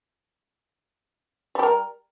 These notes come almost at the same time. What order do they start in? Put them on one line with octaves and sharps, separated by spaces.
G3 G4 A#4